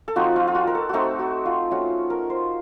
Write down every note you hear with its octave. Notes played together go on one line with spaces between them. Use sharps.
A4
F3 C4 D#4 F#4
F4
F4
F#4
A#4
A4
A3 C4 D#4 F#4 A4
F#4
F4
A3 C#4 F4 F#4
A#4
C5